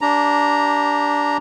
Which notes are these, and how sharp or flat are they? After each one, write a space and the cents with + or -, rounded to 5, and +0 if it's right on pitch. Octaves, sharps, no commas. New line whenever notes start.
D4 -15 G4 +0 A#5 +0